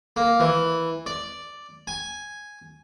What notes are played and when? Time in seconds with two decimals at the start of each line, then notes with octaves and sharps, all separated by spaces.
0.16 A#3
0.40 E3
1.06 D5
1.87 G#5